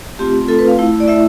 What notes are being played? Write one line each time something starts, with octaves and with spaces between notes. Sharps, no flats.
A3 C4 F4 G4
A3 C4 F4 A4
B4
F5
A3 E4
D5
A3 E4 E5